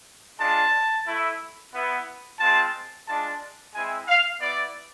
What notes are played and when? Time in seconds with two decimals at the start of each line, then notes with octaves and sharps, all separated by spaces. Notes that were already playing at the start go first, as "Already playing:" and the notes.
0.39 G#3 D4 F4 A5
1.05 A3 E4
1.73 B3 E4
2.39 G#3 C4 F4 A5
3.07 G#3 D4 F4 A5
3.74 G#3 C4 E4 G#5
4.08 F5
4.40 B3 E4 D5